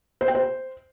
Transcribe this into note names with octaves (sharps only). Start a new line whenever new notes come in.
C5
G5
C5